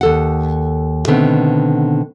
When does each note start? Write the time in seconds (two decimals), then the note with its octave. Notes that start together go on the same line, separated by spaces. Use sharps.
0.01 D#2 A4 F#5
1.08 B2 D3 D#3 A3 B3 C4